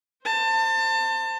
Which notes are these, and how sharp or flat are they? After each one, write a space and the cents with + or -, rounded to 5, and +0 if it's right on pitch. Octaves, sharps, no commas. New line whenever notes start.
C5 +0 A5 +30